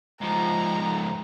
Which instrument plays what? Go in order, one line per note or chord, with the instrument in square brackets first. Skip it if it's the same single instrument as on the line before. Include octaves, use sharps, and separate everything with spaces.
[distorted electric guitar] G#2 F3 [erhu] A#5